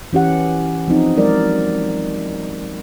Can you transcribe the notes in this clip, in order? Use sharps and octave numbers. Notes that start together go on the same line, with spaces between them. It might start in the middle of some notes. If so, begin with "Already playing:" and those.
E3 C#4 G4 F#5
F3 C4 D#4
F#3 G#3 A#4 D5